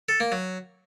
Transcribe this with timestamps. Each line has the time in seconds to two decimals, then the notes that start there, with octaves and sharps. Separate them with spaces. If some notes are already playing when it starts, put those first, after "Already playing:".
0.09 A4
0.20 A#3
0.32 F#3